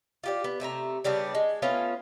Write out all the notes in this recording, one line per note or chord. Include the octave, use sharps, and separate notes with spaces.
F4 G4 D5
B3
C3 A3 E5 A#5
C#3 G3 B3 D4
G#3
A3 B3 C#4 F4